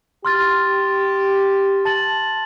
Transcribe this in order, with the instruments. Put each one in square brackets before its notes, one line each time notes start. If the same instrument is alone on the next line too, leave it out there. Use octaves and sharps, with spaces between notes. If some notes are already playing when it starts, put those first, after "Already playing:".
[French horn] G4 [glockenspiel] C6 F6 A6
[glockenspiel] A5 A6 F#7